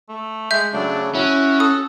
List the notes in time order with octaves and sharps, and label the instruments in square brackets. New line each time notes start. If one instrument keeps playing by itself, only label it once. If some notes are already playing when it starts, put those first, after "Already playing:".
[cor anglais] A3
[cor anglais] G#3 [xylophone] E5 G6
[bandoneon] C#3 F#3 A3 [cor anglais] D4
[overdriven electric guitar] C#4 [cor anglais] E4 [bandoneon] F#4
[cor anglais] A4 [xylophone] D#6